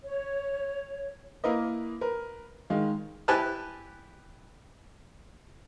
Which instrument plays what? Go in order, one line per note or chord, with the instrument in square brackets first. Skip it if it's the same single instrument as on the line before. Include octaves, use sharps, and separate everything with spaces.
[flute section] C#5
[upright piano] A#3 E4 A#4 B4 D#5
A#4 B4
D#3 G#3 F5
[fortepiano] E4 G4 B4 G#5 A5 F#6